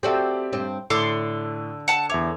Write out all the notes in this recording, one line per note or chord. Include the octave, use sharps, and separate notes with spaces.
C4 F#4 G4 A4 D5 E5
G2 C4
A2 D3 A4 C6 D6
F#5 A5
E2 C#5 E5 D6